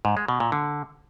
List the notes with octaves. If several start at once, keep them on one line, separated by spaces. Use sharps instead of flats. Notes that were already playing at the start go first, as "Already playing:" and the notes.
G#2
G#3
B2
A#2
D3